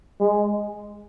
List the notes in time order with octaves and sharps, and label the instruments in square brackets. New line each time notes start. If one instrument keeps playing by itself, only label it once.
[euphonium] G#3